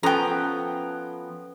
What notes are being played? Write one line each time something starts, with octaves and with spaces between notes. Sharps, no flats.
F3 B3 C#4 A4 B4 G5 A#5